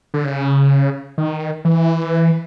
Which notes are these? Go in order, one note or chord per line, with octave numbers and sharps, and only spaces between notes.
D3
C#3
D#3
E3